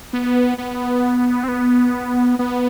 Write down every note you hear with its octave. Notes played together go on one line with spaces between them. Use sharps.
B3
B3
C4
B3
B3